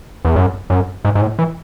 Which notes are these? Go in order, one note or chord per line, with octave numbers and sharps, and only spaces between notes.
E2
F#2
F#2
G#2
G#2
A2
E3